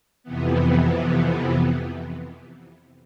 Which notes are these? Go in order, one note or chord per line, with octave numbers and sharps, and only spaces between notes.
F2 C3 E3 B3